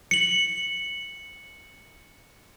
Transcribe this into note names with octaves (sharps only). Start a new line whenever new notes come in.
C#7 F#7